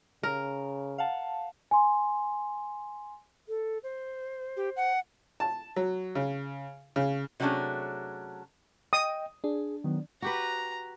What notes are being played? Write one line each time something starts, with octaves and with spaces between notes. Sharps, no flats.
C#3 A#4
F5 F#5 A5
G#5 C6
A4
C5
G4
F#5
A5
F#3
C#3
C#3
C3 F#3 A3 C#4 D4 G#4
D#5 G5 D#6
D4 G#4
D#3 F#3 B3
F#4 G4 B4 A#5